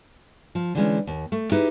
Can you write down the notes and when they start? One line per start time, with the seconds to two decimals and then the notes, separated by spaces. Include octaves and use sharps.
0.55 F3
0.75 D3 E3 G#3 C#4
1.07 D#2
1.32 A3
1.52 D#4 E4 G4 G#4 B4